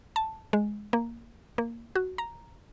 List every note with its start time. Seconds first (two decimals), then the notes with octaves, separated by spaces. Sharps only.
0.16 A5
0.53 G#3
0.93 A#3
1.58 A#3
1.95 F#4
2.18 A#5